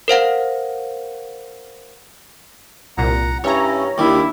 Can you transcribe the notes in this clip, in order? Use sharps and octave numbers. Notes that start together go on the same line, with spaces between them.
A#4 C5 F5 F#5
C2 A#2 F#5 A#5
G2 C#4 E4 C#5 A#5
D#2 G3 D4 E4 D6